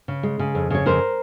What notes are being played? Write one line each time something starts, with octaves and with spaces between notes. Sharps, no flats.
C#3
G#3
C#3
F2
C#3 C#5
F2 A#4 C5